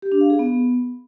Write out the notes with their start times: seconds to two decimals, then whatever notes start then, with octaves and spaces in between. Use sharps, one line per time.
0.02 G4
0.12 D4
0.21 F5
0.30 G#4
0.39 B3